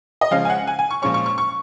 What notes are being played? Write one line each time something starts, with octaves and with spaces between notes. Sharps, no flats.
D#5
C#3 F3 G#3 C#4 F5
G#5
F#5
G#5
G#5
C#6
A#2 F3 G#3 C#4 C#6
C#6
C#6
C#6